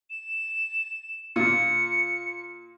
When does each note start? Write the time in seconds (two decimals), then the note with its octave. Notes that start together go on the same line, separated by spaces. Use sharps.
0.10 E7
1.36 A#2 C#7